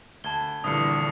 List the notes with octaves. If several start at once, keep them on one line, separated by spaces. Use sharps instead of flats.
D2 A5 G#6 G7
A#1 G2 D3 E3 D#6 C7 C#7